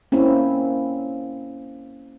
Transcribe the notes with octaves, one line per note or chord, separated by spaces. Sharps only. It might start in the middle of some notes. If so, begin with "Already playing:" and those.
A#3 C4 C#4 E4